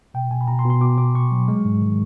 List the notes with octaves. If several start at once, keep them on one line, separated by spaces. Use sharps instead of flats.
B2 G5
B2 G#5
B5
B2 A#5
C6
B2
C6
B2 D6
B2 D6
B2 C#6
F#3
G#3
G#2
D#3